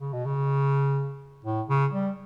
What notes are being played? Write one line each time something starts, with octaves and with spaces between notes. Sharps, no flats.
C#3
B2
C#3
A2
C#3
G3